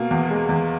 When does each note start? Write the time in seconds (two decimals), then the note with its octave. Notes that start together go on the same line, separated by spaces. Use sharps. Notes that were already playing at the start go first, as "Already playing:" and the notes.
Already playing: B2 A#3
0.11 E2
0.30 G#3
0.49 E2